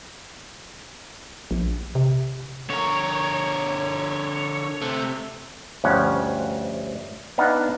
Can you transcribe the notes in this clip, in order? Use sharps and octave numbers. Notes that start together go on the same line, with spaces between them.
A#1
C3
D3 A#4 C#5
C3 A3
D2 G2 F3 C#4 F#5
B3 D4 D#4 F5 F#5